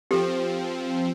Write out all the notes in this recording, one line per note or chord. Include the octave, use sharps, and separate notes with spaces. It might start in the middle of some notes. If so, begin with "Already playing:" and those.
F3 C4 G4 A4